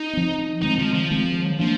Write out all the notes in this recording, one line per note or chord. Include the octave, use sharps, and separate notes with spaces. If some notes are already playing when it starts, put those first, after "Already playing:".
Already playing: D#4
F3 C4
D#3 G#3 C4 D#4
F3
F3
D#3 G#3 C4
F3 A#3 D4